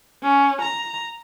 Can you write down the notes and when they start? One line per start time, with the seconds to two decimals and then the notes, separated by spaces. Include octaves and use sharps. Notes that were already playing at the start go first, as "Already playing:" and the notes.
0.23 C#4
0.62 A#5